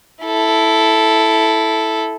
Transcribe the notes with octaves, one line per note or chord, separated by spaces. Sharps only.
E4 A4